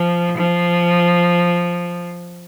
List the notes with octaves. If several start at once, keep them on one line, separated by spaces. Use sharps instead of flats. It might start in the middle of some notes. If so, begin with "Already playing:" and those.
Already playing: F3
F3